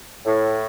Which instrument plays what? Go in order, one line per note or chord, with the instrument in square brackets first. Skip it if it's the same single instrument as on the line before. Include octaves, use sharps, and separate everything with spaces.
[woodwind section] A2